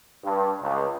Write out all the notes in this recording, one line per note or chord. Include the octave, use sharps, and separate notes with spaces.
G2
C#2